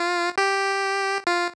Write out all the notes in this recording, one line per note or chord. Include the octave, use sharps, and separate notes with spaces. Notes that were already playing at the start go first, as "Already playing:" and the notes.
Already playing: F4
G4
F4